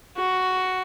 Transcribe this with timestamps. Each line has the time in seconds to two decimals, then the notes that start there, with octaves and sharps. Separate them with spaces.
0.17 F#4